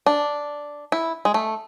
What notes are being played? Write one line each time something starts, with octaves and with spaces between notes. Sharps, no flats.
D4
E4
G#3
A3